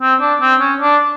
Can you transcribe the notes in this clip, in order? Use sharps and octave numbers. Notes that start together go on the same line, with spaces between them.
C4
D4
C4
C#4
D4